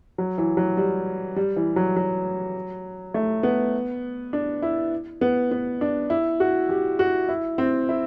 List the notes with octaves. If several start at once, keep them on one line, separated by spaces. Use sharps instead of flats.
F#3
E3
F#3
G3
G3
E3
F#3
F#3
A3
B3
D4
E4
B3
B3
D4
E4
F#4
G4
F#4
E4
C4
E4